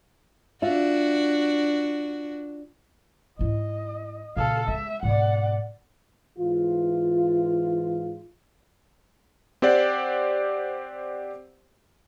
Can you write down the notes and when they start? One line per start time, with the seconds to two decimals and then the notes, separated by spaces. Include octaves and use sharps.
0.62 D4 F4 F#4 E5
3.39 G#2 E4 D#5
4.37 A#2 C#3 A4 F5
4.68 G#3 E5
5.03 G#2 B2 D5 F#5
6.38 G#2 E3 F4
9.62 C4 G4 C5 D5 F#5